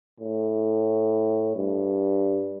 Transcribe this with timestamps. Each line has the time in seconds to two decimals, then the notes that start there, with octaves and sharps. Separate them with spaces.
0.20 A2
1.56 G2